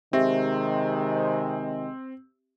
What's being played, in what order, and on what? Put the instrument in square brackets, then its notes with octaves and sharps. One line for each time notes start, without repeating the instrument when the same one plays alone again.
[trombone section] C3 D#3 G#3 [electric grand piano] C4 [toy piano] G4 E5